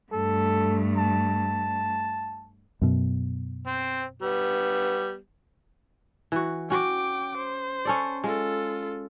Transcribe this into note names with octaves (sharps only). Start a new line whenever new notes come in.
G2 A3 A4
A5
F#2 B2
C4
G3 B3
E3 F#4
C#4 F#4 G5 D6
C5
C#4 A4 D5
G#3 F4 A4